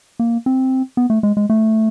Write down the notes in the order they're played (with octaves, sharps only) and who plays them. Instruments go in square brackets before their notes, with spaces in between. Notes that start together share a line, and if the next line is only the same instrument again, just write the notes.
[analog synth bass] A#3
C4
B3
A3
G#3
G#3
A3